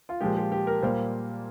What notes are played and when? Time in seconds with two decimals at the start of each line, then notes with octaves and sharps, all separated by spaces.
0.09 F4
0.20 A#2 F3 G#3 G4
0.36 G4
0.52 G4
0.67 A#4
0.82 A#2 G3 A#3 C5